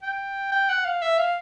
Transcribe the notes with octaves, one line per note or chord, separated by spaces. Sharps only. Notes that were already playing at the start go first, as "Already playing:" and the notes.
G5
G5
F#5
F5
E5
F5